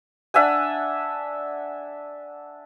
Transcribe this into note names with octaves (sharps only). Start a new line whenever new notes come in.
D4 E5 F#5 G#5